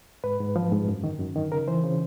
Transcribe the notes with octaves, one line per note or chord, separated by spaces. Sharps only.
G#2 B4
G#2
F3
G#2
F#2
D#3
F#2
D#3
C#3 A#4
E3 C5
C#3